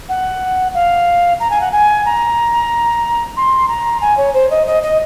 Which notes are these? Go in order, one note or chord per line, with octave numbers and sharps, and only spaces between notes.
F#5
F5
A#5
G#5
F#5
G#5
A#5
C6
A#5
G#5
C#5
C5
D#5
D#5
D#5